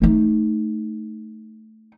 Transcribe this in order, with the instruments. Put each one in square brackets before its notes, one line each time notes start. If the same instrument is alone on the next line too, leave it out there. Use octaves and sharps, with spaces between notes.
[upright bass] A3 D#4